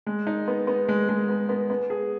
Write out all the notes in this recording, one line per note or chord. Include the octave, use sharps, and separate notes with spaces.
G#3
D#4
B3
B3
G#3
G#3
B3
B3
B3
G#4